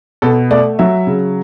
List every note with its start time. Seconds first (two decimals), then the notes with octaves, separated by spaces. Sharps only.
0.22 B2 A4
0.51 A3 D5
0.79 F#3 E5
1.07 C#3